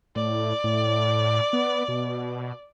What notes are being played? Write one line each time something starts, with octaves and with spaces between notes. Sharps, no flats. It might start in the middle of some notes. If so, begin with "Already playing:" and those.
A2 D5
A2
B3
B2